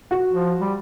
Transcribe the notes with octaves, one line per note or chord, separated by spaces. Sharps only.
F#4
F3
G3